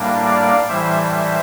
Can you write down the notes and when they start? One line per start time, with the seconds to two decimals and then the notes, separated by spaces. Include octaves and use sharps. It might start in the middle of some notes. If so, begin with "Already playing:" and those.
Already playing: A2 G3 A#3 D4
0.25 D5 F5
0.68 A2 E3 G3 C5 E5
1.12 C5 E5